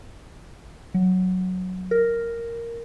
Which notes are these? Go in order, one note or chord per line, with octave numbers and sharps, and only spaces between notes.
F#3
A#4